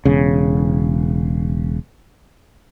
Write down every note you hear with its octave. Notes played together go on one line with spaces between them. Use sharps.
E1 C#3